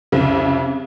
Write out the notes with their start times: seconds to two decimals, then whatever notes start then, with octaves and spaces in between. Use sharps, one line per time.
0.12 C2 F2 C#3